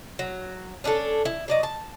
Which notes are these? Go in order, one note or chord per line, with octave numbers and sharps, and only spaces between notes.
F#3
C#4 D4 F4 A4
E4
F#3 D5 D#5
A5